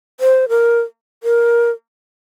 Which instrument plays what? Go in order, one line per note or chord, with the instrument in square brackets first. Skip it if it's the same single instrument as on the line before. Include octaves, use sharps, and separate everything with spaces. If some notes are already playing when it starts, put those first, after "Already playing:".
[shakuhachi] C5
A#4
A#4